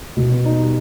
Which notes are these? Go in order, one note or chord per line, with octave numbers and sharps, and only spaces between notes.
B2
B3
D#4
G3